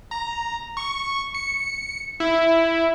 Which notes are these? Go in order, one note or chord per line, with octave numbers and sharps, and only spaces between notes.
A#5
C#6
C#7
E4